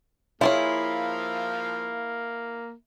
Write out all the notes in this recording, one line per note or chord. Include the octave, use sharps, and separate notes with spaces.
F3 A#3 E4 F4 G#4 C#5 F5